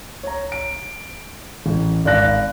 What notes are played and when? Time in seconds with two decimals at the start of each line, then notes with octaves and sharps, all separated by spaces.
0.23 C#5 A#5
0.52 D7
1.66 A1
2.05 G#1 D5 F5 F#6 A#6